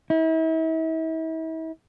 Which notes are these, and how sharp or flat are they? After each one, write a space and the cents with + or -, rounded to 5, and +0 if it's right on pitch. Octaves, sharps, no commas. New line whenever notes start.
E4 -40